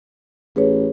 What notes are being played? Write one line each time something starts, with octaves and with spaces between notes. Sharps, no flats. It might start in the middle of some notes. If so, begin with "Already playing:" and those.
A1 G#4 B4 C#5